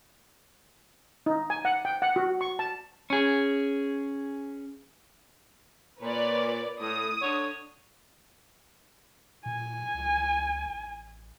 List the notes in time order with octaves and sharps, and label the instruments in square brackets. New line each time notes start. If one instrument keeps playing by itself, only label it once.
[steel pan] D#4
G#5
F#5
G5
F#5
F#4
C#6
A5
[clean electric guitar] C#4 G#4
[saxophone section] A#2 [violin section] B4 C#5 D5
[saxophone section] A2 [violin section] D#6
[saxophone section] D3 C#5
[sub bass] A#2 [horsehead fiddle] G#5
[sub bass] C#2
A1